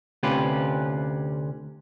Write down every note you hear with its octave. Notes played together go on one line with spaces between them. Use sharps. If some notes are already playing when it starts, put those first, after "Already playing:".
D2 C3 C#4 F4 G4 B4